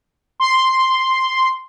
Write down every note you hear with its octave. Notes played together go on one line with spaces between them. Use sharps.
C6